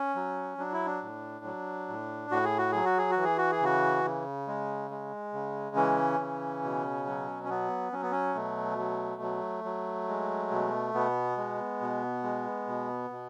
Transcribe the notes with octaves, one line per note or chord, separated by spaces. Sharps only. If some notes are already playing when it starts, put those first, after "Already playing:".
Already playing: C#4
F#3
F#3 D4
E4
D4
A2
F#3
A2
A2 F#4
G#4
F#4
F#3 G#4
F#4
G#4
F#4
E3
G#4
F#4
G#4
C#3 F#4
C#3
G#3
G#3
C#3
E3 C#4
C#3
B2
F#3
C#4
F#3 B3
F#3 C#4
B3
C#4
B2 A3
F#3
F#3
F#3
G#3
B2
B2 B3
G#3
B2
G#3
B2
B2